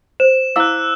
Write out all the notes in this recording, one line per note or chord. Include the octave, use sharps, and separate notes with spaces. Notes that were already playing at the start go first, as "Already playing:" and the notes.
C5 E7
E4 F5 D6 E6 F#6